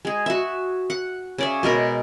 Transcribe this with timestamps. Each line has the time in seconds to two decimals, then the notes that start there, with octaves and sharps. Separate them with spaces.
0.05 G#3 G#4
0.26 F#4 E5
0.90 F#5
1.38 C#3 D5 E5
1.63 B2 G#3 A#4 B5